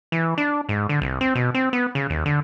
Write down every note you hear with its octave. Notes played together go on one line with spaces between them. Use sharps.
E3
D4
G#2
D3
C2
C4
B2
C4
B3
C#3
D#2
D3